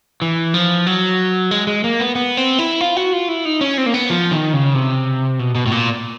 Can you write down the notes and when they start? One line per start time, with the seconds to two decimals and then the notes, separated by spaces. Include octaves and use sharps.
0.22 E3
0.54 F3
0.87 F#3
1.51 G#3
1.67 G#3
1.84 A#3
1.99 B3
2.15 B3
2.37 C4
2.59 E4
2.81 F4
2.97 F#4
3.13 F4
3.28 E4
3.45 D#4
3.61 C#4
3.78 C4
3.86 A#3
3.94 B3
4.10 F3
4.32 D#3
4.53 C#3
4.74 C3
5.39 B2
5.55 B2
5.66 A2
5.71 A#2